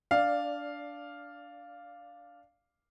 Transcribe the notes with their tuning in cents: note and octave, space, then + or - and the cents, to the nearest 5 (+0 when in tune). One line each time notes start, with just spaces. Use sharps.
D4 -15 D5 +0 F5 +0